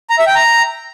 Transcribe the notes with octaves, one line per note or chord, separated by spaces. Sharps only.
A#5
E5
G5
A#5